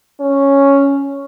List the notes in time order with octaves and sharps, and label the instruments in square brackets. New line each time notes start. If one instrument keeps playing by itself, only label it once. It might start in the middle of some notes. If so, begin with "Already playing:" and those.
[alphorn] C#4